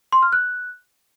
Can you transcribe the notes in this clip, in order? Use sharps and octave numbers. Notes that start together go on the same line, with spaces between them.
C6
F6
F#6